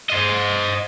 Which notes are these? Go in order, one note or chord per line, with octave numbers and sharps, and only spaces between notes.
C5 D#5